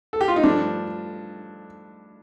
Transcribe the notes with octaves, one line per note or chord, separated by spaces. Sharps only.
A4
G4
F4
D#4
G2 F3 A3 D4